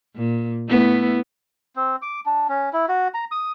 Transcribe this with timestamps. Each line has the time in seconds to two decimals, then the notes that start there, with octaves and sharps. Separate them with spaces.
0.16 A#2
0.68 A3 B3 E4
1.76 C4
2.02 D6
2.26 D4
2.49 C#4
2.73 E4
2.88 F#4
3.14 A#5
3.32 D#6